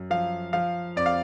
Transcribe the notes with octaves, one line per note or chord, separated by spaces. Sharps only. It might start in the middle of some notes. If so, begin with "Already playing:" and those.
Already playing: F#2
F3 F5
F3 F5
F2 D5
F5